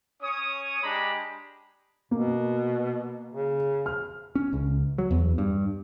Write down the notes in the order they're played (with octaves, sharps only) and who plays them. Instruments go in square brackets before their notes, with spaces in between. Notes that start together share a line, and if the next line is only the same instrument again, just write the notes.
[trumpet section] C#4 C#5 C#6 D#6
G#3 D4 G4 A#5 B5
[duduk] B2 [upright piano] A#3
[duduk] C#3
[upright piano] F6
[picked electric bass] C#4
C#2
F#3
E2
G2